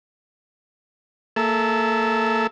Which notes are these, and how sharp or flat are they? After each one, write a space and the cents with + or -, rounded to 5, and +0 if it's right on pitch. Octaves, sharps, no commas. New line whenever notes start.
A#3 -30 A4 -30 E5 +0